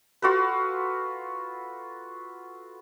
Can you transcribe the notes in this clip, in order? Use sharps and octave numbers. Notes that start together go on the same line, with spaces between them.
F4 F#4 A4 B4